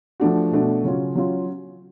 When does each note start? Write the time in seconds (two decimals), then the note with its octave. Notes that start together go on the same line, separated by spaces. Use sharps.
0.20 F3 A3 D4 F#4
0.51 B2 A3 D4 F#4
0.84 C#3 F#3 C#4 F4
1.15 F#3 C#4 F4